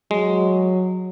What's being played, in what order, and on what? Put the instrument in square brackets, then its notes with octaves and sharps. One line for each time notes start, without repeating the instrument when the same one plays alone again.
[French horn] F#3 [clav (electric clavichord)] G#3